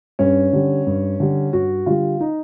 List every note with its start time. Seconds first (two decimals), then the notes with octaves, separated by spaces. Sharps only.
0.19 G2 C#4
0.53 D3 G3
0.87 G2
1.20 D3 G3
1.53 G2 F#4
1.86 D3 G3 F4
2.20 D#4